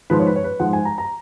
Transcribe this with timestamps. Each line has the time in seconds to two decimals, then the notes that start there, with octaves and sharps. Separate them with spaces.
0.10 G#2 F3 G#3 B4
0.19 C#5
0.27 B4
0.36 C#5
0.44 B4
0.59 G#2 F3 G#3 F#5
0.73 G#5
0.85 A#5
0.98 A#5